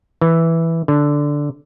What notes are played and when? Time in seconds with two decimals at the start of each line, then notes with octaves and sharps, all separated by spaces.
0.21 E3
0.88 D3